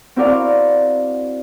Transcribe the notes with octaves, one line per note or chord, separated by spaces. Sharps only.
C4 E4 F#4 A#4 D5 F5